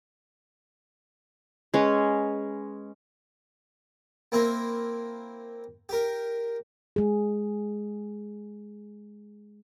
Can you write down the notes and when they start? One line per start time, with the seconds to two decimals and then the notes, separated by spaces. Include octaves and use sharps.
1.74 G#3 C#4 B4 C#5
4.32 A#3 C4 E4 A#4
5.89 G4 A#4
6.96 G#3 G#4